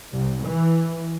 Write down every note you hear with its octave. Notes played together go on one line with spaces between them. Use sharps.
C2
E3